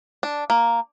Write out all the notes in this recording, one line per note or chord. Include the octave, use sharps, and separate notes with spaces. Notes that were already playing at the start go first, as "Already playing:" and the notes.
D4
A#3